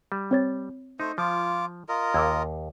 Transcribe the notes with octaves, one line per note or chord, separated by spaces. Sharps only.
G3
C4 C#5 A6
A3 D#4 C5
F3 F4 D6
F4 A#4 D#5
D#2 D6 E6 G#6